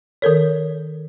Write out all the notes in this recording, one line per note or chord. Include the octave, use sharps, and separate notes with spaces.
D#3 A4 A#4 C#5